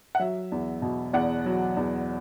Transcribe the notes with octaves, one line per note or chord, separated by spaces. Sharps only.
F#5
F#3 E5
E2
B2
E2 D5 F#5
F#3
E2